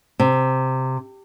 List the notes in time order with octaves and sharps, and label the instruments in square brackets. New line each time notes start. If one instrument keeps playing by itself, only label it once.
[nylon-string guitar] C3